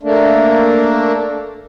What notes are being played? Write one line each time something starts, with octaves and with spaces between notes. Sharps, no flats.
A3 A#3 D4